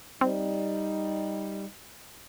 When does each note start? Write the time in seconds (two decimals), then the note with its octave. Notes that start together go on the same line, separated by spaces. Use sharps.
0.21 G3 C4 D#4